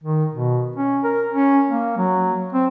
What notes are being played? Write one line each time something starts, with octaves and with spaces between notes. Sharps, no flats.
D#3
B2
C#4
A#4
C#4
A#3
F#3
C4